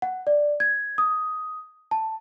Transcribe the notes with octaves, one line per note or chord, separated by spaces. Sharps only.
F#5
D5
G#6
D#6
A5